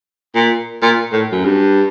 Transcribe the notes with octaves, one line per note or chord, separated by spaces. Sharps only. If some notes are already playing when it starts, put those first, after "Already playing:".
A#2
A#2
A2
F#2
G2